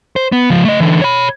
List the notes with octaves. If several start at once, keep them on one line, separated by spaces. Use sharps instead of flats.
C5
B3
C#2 F3
A3 D#5
D3 E3
C#5 B5